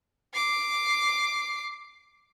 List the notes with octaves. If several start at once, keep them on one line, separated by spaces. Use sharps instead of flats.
D6 C7